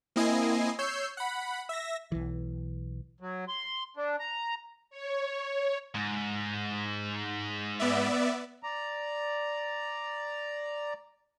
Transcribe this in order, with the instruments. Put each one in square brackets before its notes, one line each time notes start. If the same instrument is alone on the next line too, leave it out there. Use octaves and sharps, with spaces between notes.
[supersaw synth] A#3 C4 E4 D#5 G#5 C7
C#5 E6 G6 C7
F#5 B5
E5 A#6
[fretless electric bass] B1 E3
[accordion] F#3
C6
D4
A#5
[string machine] C#5
[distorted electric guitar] G#2
[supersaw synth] B3 D5 E5
[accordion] D5 A#5